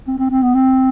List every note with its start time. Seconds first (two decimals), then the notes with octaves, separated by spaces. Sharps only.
0.08 C4
0.19 C4
0.31 C4
0.43 B3
0.55 C4